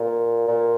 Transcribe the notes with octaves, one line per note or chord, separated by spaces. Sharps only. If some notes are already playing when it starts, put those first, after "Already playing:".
Already playing: A#2
A#2